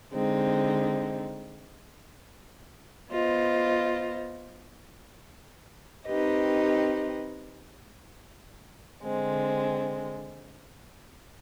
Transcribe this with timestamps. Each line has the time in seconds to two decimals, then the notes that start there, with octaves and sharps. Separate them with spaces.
0.13 D3 G#3 C4 D#4
3.10 B3 F4 C5 D#5
6.07 C4 D#4 G4 B4 D#5
9.03 D3 G#3 C4